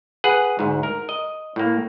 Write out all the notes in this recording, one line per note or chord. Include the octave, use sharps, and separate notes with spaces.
G#4 B4 F#5
D2 G#2
A#4
D#5
A2 A#3